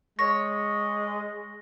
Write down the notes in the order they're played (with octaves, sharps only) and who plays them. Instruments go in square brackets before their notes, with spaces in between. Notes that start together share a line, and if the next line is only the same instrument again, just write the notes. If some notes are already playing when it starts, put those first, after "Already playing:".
[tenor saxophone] G#3 [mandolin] C#5 [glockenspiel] A#6